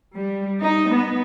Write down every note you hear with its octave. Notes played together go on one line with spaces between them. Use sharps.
G3
D#4
B3